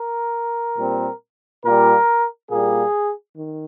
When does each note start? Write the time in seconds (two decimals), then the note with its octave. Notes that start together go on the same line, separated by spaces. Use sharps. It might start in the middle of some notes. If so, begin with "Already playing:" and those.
Already playing: A#4
0.77 A#2 G3 C4
1.64 A#2 G3 A#3 A#4
2.51 A#2 G3 A#3 G#4
3.37 D#3